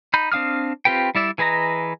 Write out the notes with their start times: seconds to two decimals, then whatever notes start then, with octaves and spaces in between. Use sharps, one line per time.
0.14 D#4 B5 G6
0.32 C4 D4 F5 D#6 F6
0.85 C4 F4 G4 B4 G5
1.15 G3 E4 D5 E5
1.38 E3 G#4 B4 D#5 A#5